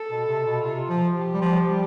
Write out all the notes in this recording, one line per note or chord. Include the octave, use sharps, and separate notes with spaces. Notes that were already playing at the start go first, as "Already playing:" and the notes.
Already playing: A4
B2
C3
B2
C3 F4
F3
G4
G3
F3
G3